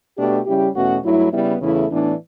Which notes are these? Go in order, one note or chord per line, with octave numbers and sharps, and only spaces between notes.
B2 A3 D4 G4
C#3 G3 C#4 E4 G4
E2 B2 A3 C#4 F#4
G2 F#3 A3 E4
C#3 G3 B3 E4
E2 C#3 E3 A3 E4
A2 E3 B3 D4